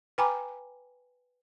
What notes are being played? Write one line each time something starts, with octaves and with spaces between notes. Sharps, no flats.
B4 G5 G#5 A#5 B5 D6